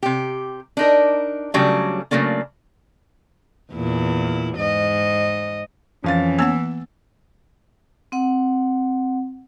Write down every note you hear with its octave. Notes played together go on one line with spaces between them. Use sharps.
C3 G4
D4 D#4 A#4
C#3 F#3 G3 A3 D4
C#3 F#3 A3 A#3 D4
E2 A#2 E4
G#2 D#5
F2 E3 C#4 F5 A6
A#3 B3 F#5 E6
C4 F#5